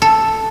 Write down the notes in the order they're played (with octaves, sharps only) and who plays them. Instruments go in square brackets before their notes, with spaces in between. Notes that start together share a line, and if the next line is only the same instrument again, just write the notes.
[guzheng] A4